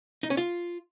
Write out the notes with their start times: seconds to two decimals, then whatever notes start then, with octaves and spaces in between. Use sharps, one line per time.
0.23 D#4
0.30 C#4
0.37 F4